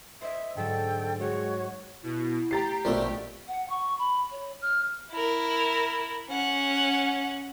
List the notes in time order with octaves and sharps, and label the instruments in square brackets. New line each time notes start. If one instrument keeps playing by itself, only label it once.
[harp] C5 D#5 [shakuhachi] E5
[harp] G#2 F#3 E7 [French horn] D3 [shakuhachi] A4 [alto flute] G5
[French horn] G#3 [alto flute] F#4 [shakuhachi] C#5
[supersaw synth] B2 [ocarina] E4
[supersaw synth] G4 [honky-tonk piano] A#5 A6 C7
[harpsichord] A#1 A3 [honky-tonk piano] B2 F3 [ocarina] D5
[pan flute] F#5
C#6
B5
C#5
F6
[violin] E4 A#4
C#4 F#5